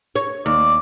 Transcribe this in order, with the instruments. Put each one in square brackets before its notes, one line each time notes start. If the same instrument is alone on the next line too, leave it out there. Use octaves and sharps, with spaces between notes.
[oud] C#5
[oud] D#2 [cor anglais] D5